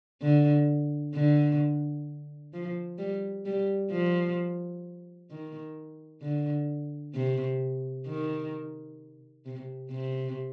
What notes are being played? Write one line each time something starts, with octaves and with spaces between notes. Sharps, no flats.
D3
D3
F3
G3
G3
F3
D#3
D3
C3
D#3
C3
C3